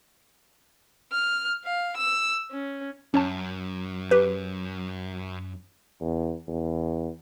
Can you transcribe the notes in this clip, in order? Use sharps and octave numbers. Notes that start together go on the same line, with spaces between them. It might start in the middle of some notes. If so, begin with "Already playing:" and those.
F6
F5
E6
C#4
F#2 C#4 C#5 A5
G4 B4
E2
E2